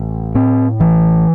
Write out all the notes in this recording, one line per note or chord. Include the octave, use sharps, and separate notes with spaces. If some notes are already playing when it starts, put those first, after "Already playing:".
Already playing: A1
A2 C4
A1 E3